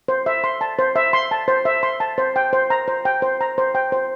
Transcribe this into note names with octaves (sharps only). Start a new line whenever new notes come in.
C5
E5
C6
A5
C5
E5
C6
A5
C5
E5
C6
A5
C5
G5
C5
A#5
C5
G5
C5
A#5
C5
G5
C5